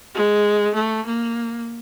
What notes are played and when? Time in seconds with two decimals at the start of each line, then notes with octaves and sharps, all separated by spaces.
0.15 G#3
0.75 A3
1.06 A#3